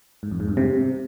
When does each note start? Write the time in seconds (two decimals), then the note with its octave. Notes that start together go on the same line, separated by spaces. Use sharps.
0.23 G#2
0.31 F2
0.40 G#2
0.49 G2
0.57 C3